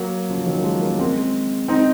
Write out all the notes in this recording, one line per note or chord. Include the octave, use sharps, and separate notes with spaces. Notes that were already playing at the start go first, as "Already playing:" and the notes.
Already playing: F#3 A#3
C#3 F3
D#3 F#3
A#3
F3 G#3
A#3 C#4
G#3 C4
C4 D#4